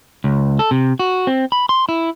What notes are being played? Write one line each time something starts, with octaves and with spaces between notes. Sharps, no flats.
C#2
A4
C3
F#4
C4
B5
C6
E4